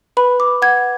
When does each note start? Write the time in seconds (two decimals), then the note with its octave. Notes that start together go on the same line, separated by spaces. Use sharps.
0.17 B4 B5
0.40 D6
0.62 F#5 G#6